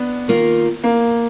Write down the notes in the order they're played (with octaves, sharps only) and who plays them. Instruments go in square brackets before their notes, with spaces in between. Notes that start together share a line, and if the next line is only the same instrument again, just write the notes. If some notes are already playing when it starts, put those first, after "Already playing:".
Already playing: [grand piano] B3 D4
[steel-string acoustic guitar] D#3 A#3 F4
[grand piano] A#3